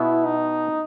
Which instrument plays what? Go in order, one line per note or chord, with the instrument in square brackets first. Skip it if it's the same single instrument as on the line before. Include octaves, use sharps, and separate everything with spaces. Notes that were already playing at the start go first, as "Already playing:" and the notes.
Already playing: [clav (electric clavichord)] B2 B3 [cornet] E4
[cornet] D#4